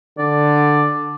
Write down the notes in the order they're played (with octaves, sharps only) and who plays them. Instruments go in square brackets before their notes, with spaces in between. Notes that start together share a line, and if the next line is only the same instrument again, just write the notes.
[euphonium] D3 [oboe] D5